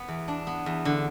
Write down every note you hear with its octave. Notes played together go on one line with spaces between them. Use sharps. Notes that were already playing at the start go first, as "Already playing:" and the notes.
Already playing: B3
E2
D4
B3
E2
D3